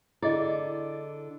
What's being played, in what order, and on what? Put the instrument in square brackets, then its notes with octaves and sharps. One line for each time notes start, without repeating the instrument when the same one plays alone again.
[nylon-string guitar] D3 D5 [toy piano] E4 G#4 D#5